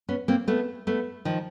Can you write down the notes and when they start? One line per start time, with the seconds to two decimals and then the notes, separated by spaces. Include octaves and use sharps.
0.08 B3 C#4
0.28 A#3 C4
0.48 A3 B3
0.87 A3 B3
1.25 D#3 F3